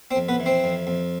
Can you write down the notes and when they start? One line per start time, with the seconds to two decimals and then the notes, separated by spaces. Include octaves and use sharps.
0.11 C4 C5
0.16 F2
0.29 B3 B4
0.40 E3
0.46 C4 C5
0.64 F2
0.87 F2